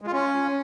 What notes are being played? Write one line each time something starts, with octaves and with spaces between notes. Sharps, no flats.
G#3
F4
C#4